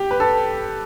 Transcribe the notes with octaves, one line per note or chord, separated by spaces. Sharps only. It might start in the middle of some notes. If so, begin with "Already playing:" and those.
Already playing: G4
B4
A4